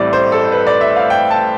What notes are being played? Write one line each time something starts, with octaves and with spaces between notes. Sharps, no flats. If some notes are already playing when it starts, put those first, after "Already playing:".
Already playing: A1 A2 G3 C4 E4 D5
C5
A4
B4
D5
E5
F5
G5
A5